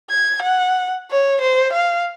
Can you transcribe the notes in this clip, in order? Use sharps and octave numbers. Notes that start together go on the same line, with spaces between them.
G#6
F#5
C#5
C5
F5